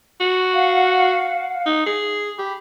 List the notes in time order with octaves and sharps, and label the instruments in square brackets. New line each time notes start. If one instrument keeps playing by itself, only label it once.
[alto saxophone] F#4
[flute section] F5 F#5
[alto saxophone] D#4
G#4
[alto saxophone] G4 [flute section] B5